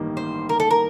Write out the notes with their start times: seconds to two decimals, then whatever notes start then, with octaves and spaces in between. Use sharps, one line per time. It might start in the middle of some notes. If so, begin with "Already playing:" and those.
Already playing: A1 G2 D#3 G3 A#3
0.17 C5
0.49 A#4
0.60 A4
0.71 A#4